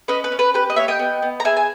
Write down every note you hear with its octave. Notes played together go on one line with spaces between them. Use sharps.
C#4 B4 D#5
B4
C#4
B4
G4 B4
D#5
A#3 C#5 E5
D#5 G5
B3
B3
A#5
G#4 E5 G#5
G#5